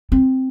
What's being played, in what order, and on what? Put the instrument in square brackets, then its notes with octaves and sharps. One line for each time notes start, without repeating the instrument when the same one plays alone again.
[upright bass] C4